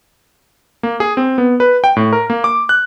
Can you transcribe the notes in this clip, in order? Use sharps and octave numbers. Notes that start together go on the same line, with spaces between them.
A#3
G#4
C4
B3
B4
G5
A2
A#4
A#3
D6
F#6